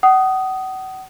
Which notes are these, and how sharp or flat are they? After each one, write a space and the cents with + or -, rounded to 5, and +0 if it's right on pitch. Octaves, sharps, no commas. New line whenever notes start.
F#5 +35 D#6 +0